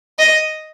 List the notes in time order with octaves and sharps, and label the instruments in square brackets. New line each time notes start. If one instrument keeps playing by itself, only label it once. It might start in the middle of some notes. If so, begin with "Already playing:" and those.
[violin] D#5